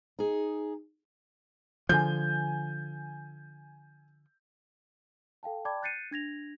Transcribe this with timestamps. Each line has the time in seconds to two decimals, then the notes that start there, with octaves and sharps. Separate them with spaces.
0.19 D#4 G#4
1.89 D3 F3 G#5 G6
5.43 A4 F5 G5 A5
5.65 D5 G5 A5 B5 D6 G#6
5.83 F#6 G6 A6 C7 C#7 D#7
6.11 D4 G#6 A#6 F7